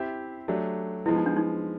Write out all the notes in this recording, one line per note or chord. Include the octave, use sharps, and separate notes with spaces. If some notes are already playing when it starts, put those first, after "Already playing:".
Already playing: C4 E4 G4 C5 E5
F#3 A3 D4 G4
F3 G#3 B3 E4
D#4
D4
D#4